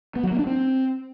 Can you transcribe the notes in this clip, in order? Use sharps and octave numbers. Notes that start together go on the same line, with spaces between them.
B3
F#3
A#3
D4
C4